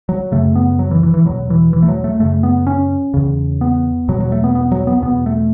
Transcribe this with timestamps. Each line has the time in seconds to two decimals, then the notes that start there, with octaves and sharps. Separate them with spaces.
0.09 F#3
0.32 F#2 C#3 A3
0.55 B3
0.79 F#3
0.91 E3
1.03 E3
1.14 E3
1.26 E2 B2 F#3
1.50 E3
1.73 E3
1.82 A3
1.88 F#3
2.04 A3
2.20 F#2 C#3 A3
2.43 B3
2.67 C#4
3.14 E2 C#3
3.61 B3
4.08 E2 B2 F#3
4.20 F#3
4.32 A3
4.44 B3
4.55 B3
4.72 F#3
4.87 B3
5.02 E2 B2 B3
5.26 A3